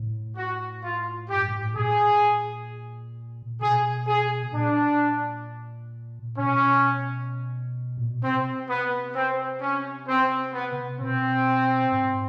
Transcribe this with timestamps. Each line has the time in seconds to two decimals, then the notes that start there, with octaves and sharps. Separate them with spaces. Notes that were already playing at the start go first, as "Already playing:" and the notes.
Already playing: A2
0.37 F#4
0.83 F4
1.30 G2 G4
1.48 G#2
1.62 A2
1.76 A#2 G#4
3.60 B2 G#4
4.07 G#4
4.53 A#2 D4
6.38 B2 C#4
7.97 A#2
8.10 B2
8.23 C3 C4
8.69 B3
9.15 C4
9.61 C#4
10.07 C4
10.53 B3
11.00 B2 C4
11.92 G#2